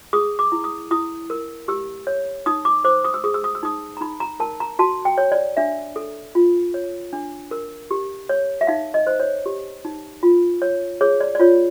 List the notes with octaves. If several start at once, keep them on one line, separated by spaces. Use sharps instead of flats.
G#4 D#6
D6
E4
D#6
E4 D#6
A#4
G4 E6
C#5
D#4 D#6
D6
C5 D6
D#6
E6
G#4 D#6
E6
D#6
E6
D#4 D#6
A#5
D#4 B5
A#5
A#4 A5
A#5
F#4 A5
G5
C#5
D5
D4 E5
A4
F4
C#5
D4
A#4
G4
C#5
E5
D#4 F5
D#5
C5
C#5
G4
D#4
F4
C#5
G#4 C#5
D5
D5
F4 C#5